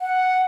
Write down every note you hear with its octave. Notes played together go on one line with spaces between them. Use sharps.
F#5